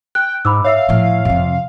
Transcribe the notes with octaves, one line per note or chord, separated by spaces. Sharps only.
G5 F#6
G#2 B5 D6 E6
C#5 E5 F5 E6
A2 F3
F2 C3